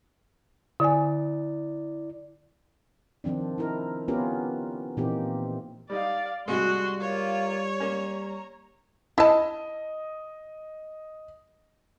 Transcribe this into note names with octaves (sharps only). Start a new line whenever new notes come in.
D3 E4 D5 G#5
D#3 F3 C4 D4
D#4 E4 A#4
B3 C#4 F4 G4 A#4 B4
A#2 E3 A#3 C4 D#4 G4
G3 D#4 D5 F5
A2 C3 G3 G#3 F#4 C6
A#3 F4 C#5
A#3 C#4 A#5
E4 D#5 A5